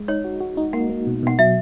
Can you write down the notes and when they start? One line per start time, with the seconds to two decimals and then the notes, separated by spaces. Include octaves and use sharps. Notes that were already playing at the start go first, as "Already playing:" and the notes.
Already playing: G#3
0.08 D#4 C#5
0.25 F#4
0.41 F#4
0.57 D#4
0.73 A#3 F#5
0.90 A#3
1.07 B2
1.23 B2 F#5
1.39 F#3 E5